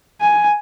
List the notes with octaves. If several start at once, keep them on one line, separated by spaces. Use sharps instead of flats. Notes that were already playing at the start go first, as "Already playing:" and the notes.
G#5